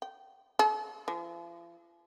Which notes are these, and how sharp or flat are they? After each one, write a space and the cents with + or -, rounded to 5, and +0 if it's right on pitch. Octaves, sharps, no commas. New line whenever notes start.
G5 -15
A4 -45
F3 -40